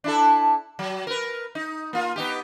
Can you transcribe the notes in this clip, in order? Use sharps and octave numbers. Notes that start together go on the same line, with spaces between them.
D4 E4 A4
F#3
A#4 B4
D#4
A#3 F4
B3 D#4 G4